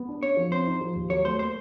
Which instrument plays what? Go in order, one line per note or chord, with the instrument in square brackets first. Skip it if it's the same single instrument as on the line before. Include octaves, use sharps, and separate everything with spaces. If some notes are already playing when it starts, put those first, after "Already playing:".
Already playing: [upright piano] B3
D4
[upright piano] C#4 [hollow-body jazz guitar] C#5
[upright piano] F3
[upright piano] C4 [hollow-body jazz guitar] C5
[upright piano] D#4
F3
D#2
[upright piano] F#3 [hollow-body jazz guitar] C#5
[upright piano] A3 [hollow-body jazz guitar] C5
[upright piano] A#3 [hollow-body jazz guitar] C5